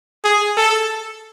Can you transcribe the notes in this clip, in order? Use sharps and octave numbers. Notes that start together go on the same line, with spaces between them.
G#4
A4